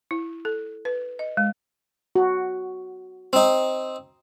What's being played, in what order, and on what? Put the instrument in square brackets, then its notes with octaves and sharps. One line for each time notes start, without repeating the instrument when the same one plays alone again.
[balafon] E4
A4
B4
D#5
G#3
[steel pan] F#4
[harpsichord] C4 D#4